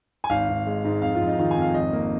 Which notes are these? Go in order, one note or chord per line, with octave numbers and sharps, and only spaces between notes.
G#5
G#1 F5
G#1
G#3
G#2
F2 F5
F4
F2
D#4
D#3 F4
G#5
F2
F5
G#1 D#5
A#3